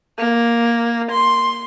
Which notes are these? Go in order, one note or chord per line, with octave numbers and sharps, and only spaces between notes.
A#3
C6